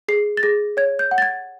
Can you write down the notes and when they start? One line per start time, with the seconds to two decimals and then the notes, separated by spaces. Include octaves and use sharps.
0.08 G#4 C7
0.37 A6
0.43 G#4 A#6
0.77 C#5 G#6
0.99 G6
1.11 F#5
1.18 A6
1.22 G#6